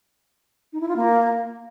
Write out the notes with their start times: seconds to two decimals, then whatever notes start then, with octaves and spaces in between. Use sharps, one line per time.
0.73 D#4
0.81 E4
0.88 F4
0.96 A#3